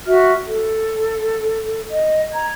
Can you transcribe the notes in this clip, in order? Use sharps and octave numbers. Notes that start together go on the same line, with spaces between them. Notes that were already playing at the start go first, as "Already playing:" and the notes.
F#4 E5 F6
A4
D#5
A#5 G#6